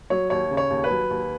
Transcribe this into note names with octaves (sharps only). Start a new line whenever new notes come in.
F#3 C#5
D#2 C#5
C#3
C#5
D#2
B4
F#3
D#2